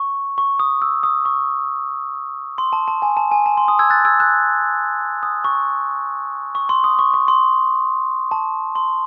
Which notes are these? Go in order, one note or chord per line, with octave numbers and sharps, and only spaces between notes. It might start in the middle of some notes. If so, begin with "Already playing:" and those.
Already playing: C#6
C#6
D#6
E6
D#6
C#6
C6
A5
A5
G#5
A5
G#5
A5
C6
D#6
E6 G#6
F#6 A6
E6 G#6
F#6
D#6
C#6
C#6
C6
D#6
C#6
C#6
C6
A5
C6